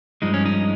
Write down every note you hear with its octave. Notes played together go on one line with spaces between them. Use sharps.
G2 F3 G#3 D#4
C#4
D#4